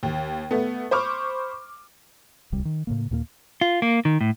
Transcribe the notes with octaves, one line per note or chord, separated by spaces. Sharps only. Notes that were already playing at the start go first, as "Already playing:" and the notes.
D#2
A3 B3
C5 B5 C#6 D6 F6
D1 C2 G3
D#3
A2 C#3 A#3
D#2 A#2 A3 A#3
F4
A#3
D#3
A2